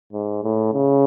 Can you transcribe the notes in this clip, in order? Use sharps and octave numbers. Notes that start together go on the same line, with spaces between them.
G#2
A2
C#3